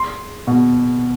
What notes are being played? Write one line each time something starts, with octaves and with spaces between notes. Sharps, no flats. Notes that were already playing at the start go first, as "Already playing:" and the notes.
Already playing: C6
B2